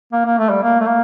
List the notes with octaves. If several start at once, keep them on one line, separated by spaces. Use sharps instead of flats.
A#3
A#3
A3
G3
A#3
A3
A#3